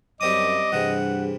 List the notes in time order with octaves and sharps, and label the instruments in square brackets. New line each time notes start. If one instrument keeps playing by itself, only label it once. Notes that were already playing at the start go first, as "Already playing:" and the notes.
[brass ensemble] F#2 [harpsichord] G3 C4 D#6 [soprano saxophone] D#5 [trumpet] D6
[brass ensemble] G2 G#4 [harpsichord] C3 E3 [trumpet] F#5